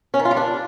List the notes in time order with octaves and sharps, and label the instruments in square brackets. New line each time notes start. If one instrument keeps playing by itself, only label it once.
[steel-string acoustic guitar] C#4
D#3
F4
G3
D4